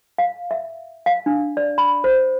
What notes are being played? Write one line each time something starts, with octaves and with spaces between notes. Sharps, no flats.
F5
E5
F5
D4
D5
B5
C5